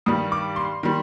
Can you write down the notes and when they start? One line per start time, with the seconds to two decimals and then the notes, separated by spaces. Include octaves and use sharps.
0.06 G2 D#3 G3 D#6
0.32 D6
0.56 C6
0.83 D#3 G3